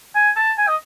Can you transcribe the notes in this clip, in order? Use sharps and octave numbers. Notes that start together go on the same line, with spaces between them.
G#5
A5
G#5
D#5